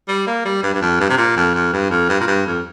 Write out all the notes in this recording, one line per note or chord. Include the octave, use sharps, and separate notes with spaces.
G3
A#3
G3
G2
G2
F2
G2
C3
A#2
F2
F2
G2
F2
G2
A#2
G2
F2